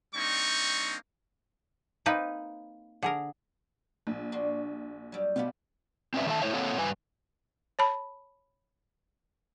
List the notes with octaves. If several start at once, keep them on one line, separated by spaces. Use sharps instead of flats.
G3 A#3 C4 D4 D#4 C#6
A#3 C4 D#4 B4
D3 G#4 A#4
A#1
D4 F#4 C6
F#3 G3
B2 B3 F4 G4
C4 C#4 B4 D5 E5
D#3 A4 B4 E5 A5
A3 E4 C5 C#5 E5
A#3 C4 A4 C#5 F#5
G2 B4 G#5
C#5 A5 B5